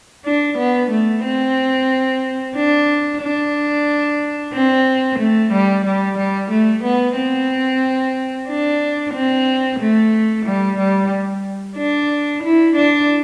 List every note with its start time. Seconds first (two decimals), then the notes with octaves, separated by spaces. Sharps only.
0.25 D4
0.58 B3
0.91 A3
1.24 C4
2.56 D4
3.22 D4
4.53 C4
5.19 A3
5.52 G3
5.85 G3
6.18 G3
6.51 A3
6.84 B3
7.16 C4
8.48 D4
9.14 C4
9.80 A3
10.46 G3
10.78 G3
11.77 D4
12.43 E4
12.76 D4